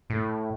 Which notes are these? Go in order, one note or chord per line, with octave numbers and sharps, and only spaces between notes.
A2